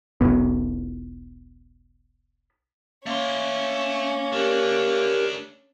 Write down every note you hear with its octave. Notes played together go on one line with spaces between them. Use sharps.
E1 B1 B3
A3 A#3 C#4 C6
A3 D4 G4 A#4